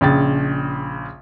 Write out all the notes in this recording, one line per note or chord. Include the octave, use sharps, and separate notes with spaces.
A#1 C#3 G5 A6